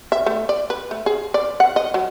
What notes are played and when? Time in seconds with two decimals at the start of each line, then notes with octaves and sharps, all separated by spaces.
0.12 E5
0.26 A3
0.49 D5
0.70 B4
0.91 A3
1.06 G#4
1.34 D5
1.60 F#5
1.76 D#5
1.94 F#3